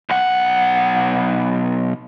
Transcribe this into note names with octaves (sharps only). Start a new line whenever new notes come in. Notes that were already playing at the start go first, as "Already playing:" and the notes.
B1 F#5